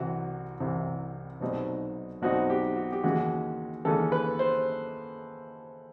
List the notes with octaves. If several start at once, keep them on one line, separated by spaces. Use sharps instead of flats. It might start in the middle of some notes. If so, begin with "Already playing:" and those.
Already playing: C2 C3 E3 F#4
C2 C3 E3
B1 B2 G3 C4 D#4
B1 B2 G3 C4 D#4 F#4
G4
F#4
G4
D#2 C#3 E3 G#3 C#4 F#4
D#2 C#3 E3 G#3 C#4 A4
B4
C5